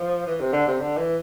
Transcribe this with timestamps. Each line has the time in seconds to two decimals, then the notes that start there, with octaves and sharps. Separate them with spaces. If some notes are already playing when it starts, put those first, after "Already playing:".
Already playing: F3
0.27 E3
0.40 C3
0.53 D3
0.67 C3
0.80 D3
0.97 E3